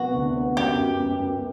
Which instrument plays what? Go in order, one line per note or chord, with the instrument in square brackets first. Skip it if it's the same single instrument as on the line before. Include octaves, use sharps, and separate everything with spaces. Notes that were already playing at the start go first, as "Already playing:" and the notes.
Already playing: [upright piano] C2 F#3 B3 [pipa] F#4
[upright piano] D2
B3
[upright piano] F#2 [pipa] G4
[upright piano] F#2
F#2
F#2